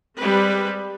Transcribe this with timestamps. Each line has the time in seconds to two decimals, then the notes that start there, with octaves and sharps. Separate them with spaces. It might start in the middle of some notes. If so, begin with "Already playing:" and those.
0.17 G3 G#3 C4 B4